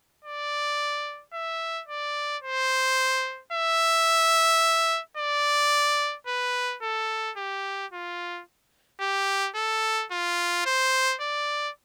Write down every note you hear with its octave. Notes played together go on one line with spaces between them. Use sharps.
D5
E5
D5
C5
E5
D5
B4
A4
G4
F4
G4
A4
F4
C5
D5